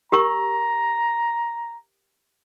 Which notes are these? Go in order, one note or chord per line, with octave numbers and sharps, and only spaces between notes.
G4 A#4 A#5 C#6